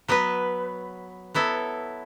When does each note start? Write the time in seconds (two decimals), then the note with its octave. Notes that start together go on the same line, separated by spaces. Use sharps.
0.08 F#3 B3 F#4 B4
1.34 F#3 B3 E4 A4